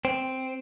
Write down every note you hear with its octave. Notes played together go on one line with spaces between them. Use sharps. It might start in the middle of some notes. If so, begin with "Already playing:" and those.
C4